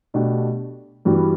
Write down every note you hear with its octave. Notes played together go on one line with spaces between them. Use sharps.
B2 A3 D4 G4
G2 E3 G3 B3 F#4